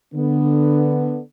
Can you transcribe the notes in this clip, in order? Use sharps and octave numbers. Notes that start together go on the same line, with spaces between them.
D3 B3